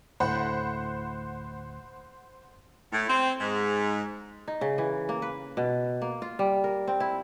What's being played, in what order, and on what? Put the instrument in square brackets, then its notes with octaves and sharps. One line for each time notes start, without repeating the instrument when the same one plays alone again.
[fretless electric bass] D2 A2 [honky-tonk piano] C5 F#5 B5
[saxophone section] A2
C4
G#2
[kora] D#4
C#3
E3
A#3
B4
B2
A#3
F4
G3
A#4
C4
E4